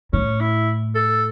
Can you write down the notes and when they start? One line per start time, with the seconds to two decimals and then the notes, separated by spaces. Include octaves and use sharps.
0.13 A2 C#4
0.40 E4
0.95 A4